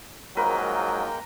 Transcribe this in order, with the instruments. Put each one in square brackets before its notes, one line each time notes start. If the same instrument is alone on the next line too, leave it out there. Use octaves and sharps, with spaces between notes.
[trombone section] G#2 F3 F#3 [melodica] G#3 A#3 G5 [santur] A#4 B4